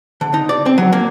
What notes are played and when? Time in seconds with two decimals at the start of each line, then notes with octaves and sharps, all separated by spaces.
0.21 D3
0.34 D#4
0.49 D5
0.66 C4
0.78 F#3
0.92 A#3